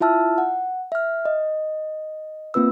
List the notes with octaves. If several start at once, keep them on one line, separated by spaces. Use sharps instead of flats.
E4 F4 E5 A5 E6 F6
F#5
E5 F6
D#5
A#3 C4 F4 B4 E6